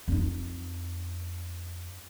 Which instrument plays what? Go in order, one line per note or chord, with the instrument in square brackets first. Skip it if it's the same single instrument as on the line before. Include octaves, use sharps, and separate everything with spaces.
[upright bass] F2 D#4